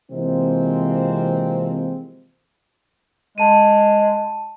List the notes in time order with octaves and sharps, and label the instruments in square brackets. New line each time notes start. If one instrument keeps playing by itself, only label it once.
[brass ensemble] C3 E3 F3 G#3 A#3 C4
[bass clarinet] G#3 [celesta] A5 D#7